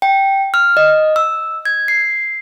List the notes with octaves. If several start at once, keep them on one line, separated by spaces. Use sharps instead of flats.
G5
F6
D#5
E6
G#6
C7